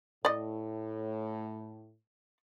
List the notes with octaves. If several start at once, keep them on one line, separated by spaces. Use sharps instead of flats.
A2 D5 D#5